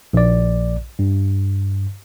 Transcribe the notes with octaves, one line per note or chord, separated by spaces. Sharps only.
A#1 D5
G2